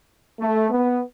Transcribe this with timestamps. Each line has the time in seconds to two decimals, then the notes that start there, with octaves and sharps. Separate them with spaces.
0.40 A3
0.70 B3